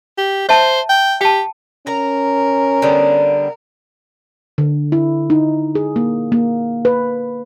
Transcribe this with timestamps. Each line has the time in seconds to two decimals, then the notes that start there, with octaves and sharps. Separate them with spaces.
0.18 G4
0.49 C5 C#5 E5 A5
0.89 G5
1.21 G4 G5 A5
1.87 C#4 A#4 A#5
2.82 D3 G3 B3
4.58 D3
4.92 E4
5.30 D#4
5.75 G#4
5.96 A#3
6.32 A#3
6.85 B4